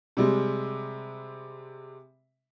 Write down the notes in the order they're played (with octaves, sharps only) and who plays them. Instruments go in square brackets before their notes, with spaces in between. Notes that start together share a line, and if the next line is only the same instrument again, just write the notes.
[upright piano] C3 G3 G#3